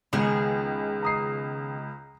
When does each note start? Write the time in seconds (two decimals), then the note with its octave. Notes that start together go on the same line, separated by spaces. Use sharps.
0.13 C#2 D#3 G#3 B3 G#4
1.03 A#5 D#6 C7